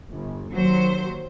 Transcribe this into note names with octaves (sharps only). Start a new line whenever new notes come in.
G1
D#2 F#3 C5